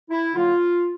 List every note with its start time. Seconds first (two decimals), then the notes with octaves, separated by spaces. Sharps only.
0.10 E4
0.35 D3 F#3 A#3 F4